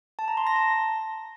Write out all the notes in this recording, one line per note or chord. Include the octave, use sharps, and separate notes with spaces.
A5
A#5
C6
A#6
A5